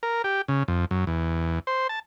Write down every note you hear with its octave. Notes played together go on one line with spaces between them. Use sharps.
A#4
G4
C#3
F2
F#2
E2
C5
A5